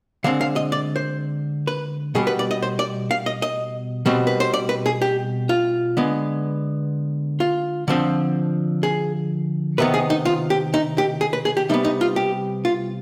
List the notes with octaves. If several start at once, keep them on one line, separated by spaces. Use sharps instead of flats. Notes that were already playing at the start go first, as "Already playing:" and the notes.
D3 G#3 C4 F5
F5
D#5
D5
C5
B4
B2 G3 B3 G#4
B4
D5
D#5
C5
D5
F5
D#5
D#5
B2 G3 C4
B4
C5
D5
B4
G#4
G4
F4
D3 G#3 B3
F4
D3 F3 C4
G#4
C3 D#3 B3 B4
G#4
D#4
F4
G4
D#4
G4
G#4
B4
G#4
G4
C3 G3 B3 D#4
D#4
F4
G4
F4